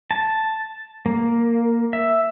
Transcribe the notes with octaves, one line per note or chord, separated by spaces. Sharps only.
A5
A#3
E5